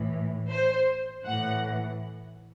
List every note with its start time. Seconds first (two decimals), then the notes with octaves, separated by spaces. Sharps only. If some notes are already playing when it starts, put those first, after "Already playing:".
Already playing: A2 E3
0.51 C5
1.27 A2 E3 F#5